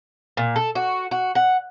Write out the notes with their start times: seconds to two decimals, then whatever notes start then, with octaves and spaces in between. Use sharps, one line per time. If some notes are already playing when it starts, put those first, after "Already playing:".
0.37 A#2
0.56 A4
0.75 F#4
1.11 F#4
1.35 F#5